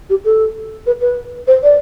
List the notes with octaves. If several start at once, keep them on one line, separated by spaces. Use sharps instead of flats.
G4
A4
B4
B4
C5
D5